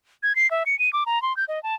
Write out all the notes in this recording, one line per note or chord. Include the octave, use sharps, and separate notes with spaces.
G#6
C7
E5
C#7
D#7
D6
A#5
C6
G6
D#5
A5